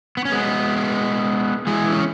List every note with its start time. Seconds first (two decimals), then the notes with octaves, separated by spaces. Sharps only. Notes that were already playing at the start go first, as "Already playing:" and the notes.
0.17 B3
0.25 C#4
0.32 G#3 B3
1.67 E3 G#3
1.92 C#4